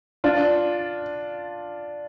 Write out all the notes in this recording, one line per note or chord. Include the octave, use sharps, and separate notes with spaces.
D4 F4